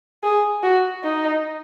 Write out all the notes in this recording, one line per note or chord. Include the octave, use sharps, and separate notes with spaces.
G#4
F#4
D#4